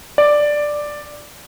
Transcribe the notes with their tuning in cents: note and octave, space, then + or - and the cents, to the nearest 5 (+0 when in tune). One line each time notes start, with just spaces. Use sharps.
D5 +5